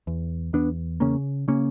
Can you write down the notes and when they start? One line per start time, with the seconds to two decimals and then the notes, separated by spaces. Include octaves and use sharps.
0.07 E2
0.53 E2 B3 D4
1.00 C#3 A#3 C#4
1.48 C#3 A#3 C#4